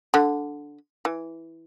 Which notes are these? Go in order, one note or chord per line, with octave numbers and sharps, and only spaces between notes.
D3
E3